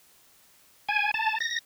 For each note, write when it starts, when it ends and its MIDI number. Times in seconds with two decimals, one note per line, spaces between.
0.89 1.11 80
1.14 1.38 81
1.40 1.59 94